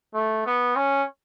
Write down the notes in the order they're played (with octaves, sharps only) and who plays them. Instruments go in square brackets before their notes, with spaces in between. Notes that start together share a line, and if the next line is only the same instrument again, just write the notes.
[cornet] A3
B3
C#4